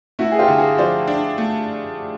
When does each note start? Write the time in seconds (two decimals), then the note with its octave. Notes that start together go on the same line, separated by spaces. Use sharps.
0.19 A3 E4 F#4
0.32 G#4
0.39 F4 G4
0.48 D3
0.58 F#4 G#4
0.78 F3 C5 D5
1.08 D4
1.38 A3